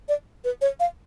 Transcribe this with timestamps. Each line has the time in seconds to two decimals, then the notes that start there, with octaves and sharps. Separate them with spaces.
0.09 D5
0.44 B4
0.61 C#5
0.80 F5